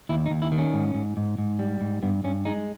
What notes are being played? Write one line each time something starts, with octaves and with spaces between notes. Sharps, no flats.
D#2 E4
D#4
D#2
E4
D#3
C#4
G#2
G#2
G#2
G#2
G3
G#2
G2 B3
G2 C#4
G#3 D#4